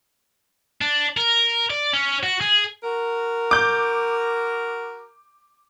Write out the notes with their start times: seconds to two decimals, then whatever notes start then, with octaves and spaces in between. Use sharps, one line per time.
0.82 D4
1.17 A#4
1.70 D5
1.94 C#4
2.23 F#4
2.41 G#4
2.84 F#4 A#4
3.51 D6 G6